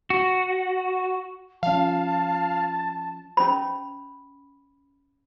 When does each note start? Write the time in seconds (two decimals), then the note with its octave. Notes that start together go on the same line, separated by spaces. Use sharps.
0.10 F#4
1.63 F3 C#4 F5 A5
3.37 C#4 B5